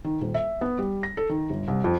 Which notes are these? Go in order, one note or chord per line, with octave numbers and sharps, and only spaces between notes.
D#3
D#1
E5
B3
G3
A#6
A4
D#3
G1
C2
F2